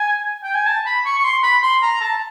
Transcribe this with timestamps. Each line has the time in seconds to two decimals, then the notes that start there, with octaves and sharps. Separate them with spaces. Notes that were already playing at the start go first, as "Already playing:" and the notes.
Already playing: G#5
0.43 G5
0.55 G#5
0.66 A5
0.86 B5
1.05 C#6
1.18 C#6
1.24 C6
1.43 B5
1.62 C6
1.82 A#5
2.01 A5